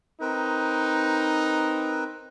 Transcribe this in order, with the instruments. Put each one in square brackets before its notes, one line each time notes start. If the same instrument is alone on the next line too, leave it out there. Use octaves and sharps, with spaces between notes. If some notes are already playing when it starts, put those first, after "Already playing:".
[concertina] C4 A#4 B4 [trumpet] D#4